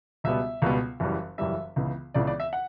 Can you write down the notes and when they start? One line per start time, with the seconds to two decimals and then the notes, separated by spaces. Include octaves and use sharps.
0.24 C#2 B2 G3 B3 E5
0.62 C#2 B2 G3 B3
1.00 F#1 F#2 E3 G3
1.38 F#1 F#2 E3 G3 E5
1.76 C#2 C#3 E3 B3
2.14 C#2 C#3 E3 B3 D5
2.27 D5
2.40 E5
2.53 F#5